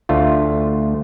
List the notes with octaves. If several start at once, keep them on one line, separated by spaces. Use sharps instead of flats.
D2 A3 F4